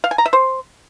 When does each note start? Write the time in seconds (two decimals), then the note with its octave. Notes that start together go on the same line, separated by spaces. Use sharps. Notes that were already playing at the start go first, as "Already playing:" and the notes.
0.04 F5
0.11 G#5
0.18 A#5
0.26 E5
0.33 C5